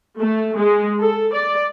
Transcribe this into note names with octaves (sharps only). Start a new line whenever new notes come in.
A3
G#3
A4
D5